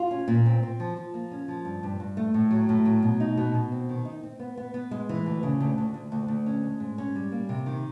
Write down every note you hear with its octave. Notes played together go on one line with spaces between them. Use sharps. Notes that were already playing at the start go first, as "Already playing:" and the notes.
Already playing: F4
C#4
A#2
C4
C4
F3
F3
A#3
C#4
F3
G2
G2
G2
A3
A2
F#3
A2
F#3
B2
D#4
B2
B2
C4
D#3
D#4
C4
B3
B3
B3
G#3
E3
D2
C#3
D2
D2
D2
D2
D2
C#4
G#3
G#2
C#4
G3
A#3
C3
D#3